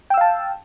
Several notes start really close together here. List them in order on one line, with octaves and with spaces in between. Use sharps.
G5 E6 F5 A5